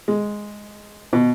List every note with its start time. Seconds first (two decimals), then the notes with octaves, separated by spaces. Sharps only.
0.08 G#3
1.13 B2